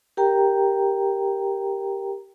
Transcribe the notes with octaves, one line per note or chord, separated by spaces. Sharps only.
G4 A#4 G5 A#5